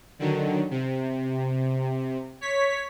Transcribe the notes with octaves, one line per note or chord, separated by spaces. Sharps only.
D3 D#3 F#3
C3
C#5 B6